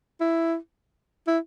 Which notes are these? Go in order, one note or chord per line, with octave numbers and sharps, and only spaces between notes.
E4
E4